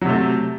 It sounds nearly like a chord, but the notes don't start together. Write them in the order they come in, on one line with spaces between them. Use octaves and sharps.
F#3 C3 A3